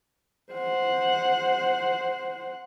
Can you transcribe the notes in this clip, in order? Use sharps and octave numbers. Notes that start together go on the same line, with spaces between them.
C5 F#5